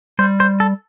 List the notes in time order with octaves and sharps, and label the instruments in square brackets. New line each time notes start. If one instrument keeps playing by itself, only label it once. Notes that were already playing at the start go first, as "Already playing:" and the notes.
[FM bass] G3 [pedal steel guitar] C5
[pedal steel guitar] C5
A4